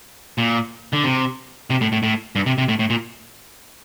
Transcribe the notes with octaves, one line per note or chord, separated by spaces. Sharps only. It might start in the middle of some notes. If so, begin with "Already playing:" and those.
A#2
D3
C3
C3
A2
A2
A2
G2
C3
C3
A2
A2
A#2